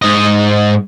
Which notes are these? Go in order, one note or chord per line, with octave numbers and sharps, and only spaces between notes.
G#2 D#5